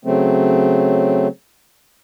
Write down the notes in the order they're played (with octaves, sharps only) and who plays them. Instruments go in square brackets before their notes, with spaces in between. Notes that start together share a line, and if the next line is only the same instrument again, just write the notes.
[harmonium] C#3 F#3 A3 C4